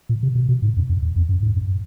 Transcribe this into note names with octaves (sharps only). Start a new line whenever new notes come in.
A#2
C3
B2
B2
G#2
F2
F2
E2
F2
F#2
G#2
F#2